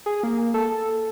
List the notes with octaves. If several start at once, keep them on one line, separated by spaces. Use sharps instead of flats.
G#4
A#3
A4